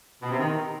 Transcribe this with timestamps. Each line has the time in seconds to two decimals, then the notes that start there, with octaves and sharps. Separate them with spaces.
0.22 B2
0.30 C3
0.39 D#3